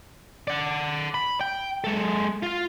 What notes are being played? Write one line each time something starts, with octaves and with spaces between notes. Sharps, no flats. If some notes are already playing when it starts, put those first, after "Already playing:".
D5 F#5
B5
G5
G#3 A4
F4 F5